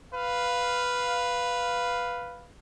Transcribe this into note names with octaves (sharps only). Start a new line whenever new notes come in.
B4 F5